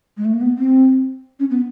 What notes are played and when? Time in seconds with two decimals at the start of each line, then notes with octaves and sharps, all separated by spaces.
0.17 G#3
0.25 A3
0.33 A#3
0.41 B3
0.58 C4
1.39 C#4
1.50 B3